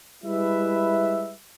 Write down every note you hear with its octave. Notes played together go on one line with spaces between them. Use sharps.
G3 G#3 E4 B4 E5